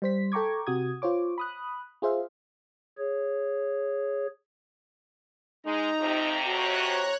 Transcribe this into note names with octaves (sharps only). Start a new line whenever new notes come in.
G3 C5 B6
A4 G5 A#5 C#6 D6 G#6
C3 F#4 D#6 G#6
F4 C5 C#5 D6
B5 D#6 F#6
F4 G#4 C5 E5 F5
G#4 C#5
G#3 D#4 A#5
F2 C3
F#4 C#5 F#6